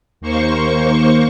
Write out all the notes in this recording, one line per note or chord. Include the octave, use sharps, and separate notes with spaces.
D#2 A#3 C5 C#6